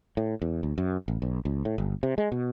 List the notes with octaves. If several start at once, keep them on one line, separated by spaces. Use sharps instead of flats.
A2
E2
D2
F#2
A1
B1
C#2
A2
G1
C3
G#3
B2